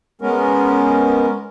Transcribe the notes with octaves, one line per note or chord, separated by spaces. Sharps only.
G#3 B3 C#4 A#4